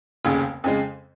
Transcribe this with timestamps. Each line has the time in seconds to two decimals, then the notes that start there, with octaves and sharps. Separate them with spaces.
0.25 F1 D#2 C#3
0.64 F2 C#3 G#3